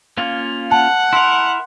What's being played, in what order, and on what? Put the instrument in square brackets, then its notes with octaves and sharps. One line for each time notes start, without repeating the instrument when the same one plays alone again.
[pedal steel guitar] A#3 C#4 F4
[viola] F#5 [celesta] A5
[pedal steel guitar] E4 A#4 [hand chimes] C6